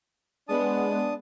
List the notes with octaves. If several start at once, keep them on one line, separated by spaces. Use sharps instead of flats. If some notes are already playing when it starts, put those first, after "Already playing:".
G#3 B3 D4 A5 D#6